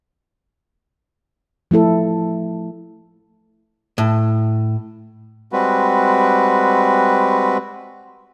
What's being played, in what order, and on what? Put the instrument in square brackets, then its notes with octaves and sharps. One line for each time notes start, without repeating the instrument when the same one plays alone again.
[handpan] F3 A3 E4 A4
[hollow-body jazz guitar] A2
[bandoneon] G3 G#3 C4 F#4 B4